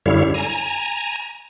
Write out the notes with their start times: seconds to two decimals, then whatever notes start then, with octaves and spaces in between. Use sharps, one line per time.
0.06 F#2 D3 G3 E4 C#5 F5
0.34 G#5 A#5